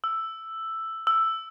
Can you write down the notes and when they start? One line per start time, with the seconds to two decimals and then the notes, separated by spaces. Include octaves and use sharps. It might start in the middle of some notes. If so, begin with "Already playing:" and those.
0.04 E6
1.07 E6